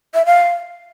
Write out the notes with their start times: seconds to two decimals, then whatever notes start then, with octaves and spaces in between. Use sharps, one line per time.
0.14 E5
0.26 F5